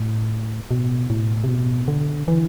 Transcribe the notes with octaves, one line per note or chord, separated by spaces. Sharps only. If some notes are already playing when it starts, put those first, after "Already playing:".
Already playing: A2
B2
A2
C3
B2
D3
E3